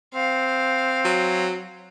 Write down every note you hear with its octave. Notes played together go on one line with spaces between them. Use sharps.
C4 F5
F#3